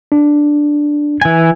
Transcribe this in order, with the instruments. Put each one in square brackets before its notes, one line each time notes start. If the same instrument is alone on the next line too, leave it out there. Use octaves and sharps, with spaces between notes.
[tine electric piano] D4
[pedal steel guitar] E3 G#5